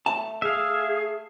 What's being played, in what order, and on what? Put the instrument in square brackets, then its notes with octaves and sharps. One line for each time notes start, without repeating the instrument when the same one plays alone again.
[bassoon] A3 [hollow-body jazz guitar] A5
[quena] G#4 [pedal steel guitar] E5 F5